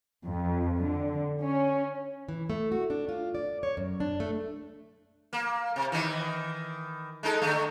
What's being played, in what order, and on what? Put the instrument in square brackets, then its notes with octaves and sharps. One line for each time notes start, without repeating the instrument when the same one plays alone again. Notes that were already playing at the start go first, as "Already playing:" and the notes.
[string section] F2
D3
C#4
[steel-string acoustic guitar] E3
A3
F#4
D4
F4
D5
C#5
F#2
D4
A3
[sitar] A#3
C3
D#3 E3
G#3 D#4 A4
D3 A3